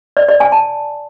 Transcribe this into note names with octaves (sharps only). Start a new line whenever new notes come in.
D5
D5
G#5
A5